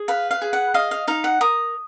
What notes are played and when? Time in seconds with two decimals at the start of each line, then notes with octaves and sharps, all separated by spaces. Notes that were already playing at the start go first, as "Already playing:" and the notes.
Already playing: G#4
0.08 B4 F5
0.31 F5
0.42 G#4
0.53 F#5
0.74 D#5 F5
0.91 F5
1.07 D#4 F5
1.24 F#5
1.41 A#4 D#6